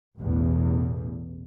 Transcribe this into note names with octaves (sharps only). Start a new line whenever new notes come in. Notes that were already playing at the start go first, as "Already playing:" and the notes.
A1 E2 B2